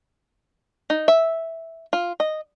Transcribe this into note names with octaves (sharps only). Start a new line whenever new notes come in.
D#4
E5
F4
D#5